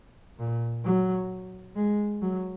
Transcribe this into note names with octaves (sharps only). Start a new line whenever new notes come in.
A#2
F#3
G#3
F#3